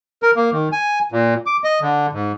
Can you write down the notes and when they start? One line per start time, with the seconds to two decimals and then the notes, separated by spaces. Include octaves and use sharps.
0.23 A#4
0.36 A#3
0.52 D#3
0.72 G#5
1.12 A#2
1.46 D6
1.64 D#5
1.81 D3
2.13 G#2